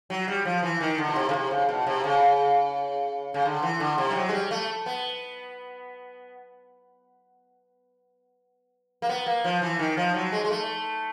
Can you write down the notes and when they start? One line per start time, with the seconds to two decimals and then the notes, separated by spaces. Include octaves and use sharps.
0.10 F#3
0.28 G3
0.45 F3
0.63 E3
0.81 D#3
0.98 D3
1.08 B2
1.16 C3
1.29 C#3
1.33 C3
1.51 C#3
1.69 B2
1.87 C3
2.04 C#3
3.34 C#3
3.45 D3
3.63 E3
3.80 D3
3.98 C3
4.10 G3
4.15 F#3
4.29 G#3
4.33 G3
4.51 A3
4.86 B3
9.02 A#3
9.09 B3
9.26 A#3
9.44 F3
9.62 E3
9.79 D#3
9.97 F3
10.14 F#3
10.32 G#3
10.45 G#3
10.50 A3